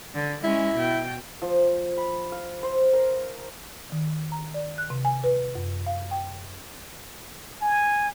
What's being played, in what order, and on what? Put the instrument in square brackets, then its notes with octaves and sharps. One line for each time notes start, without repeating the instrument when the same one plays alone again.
[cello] D3
[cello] G#3 C#4 [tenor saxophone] E4
[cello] B2 G5
[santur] F3
B5
F5
C5
A#4
[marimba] D#3
A#5
D5
F#6
C3
G#5
B4
F#2
F5
G5
[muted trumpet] G#5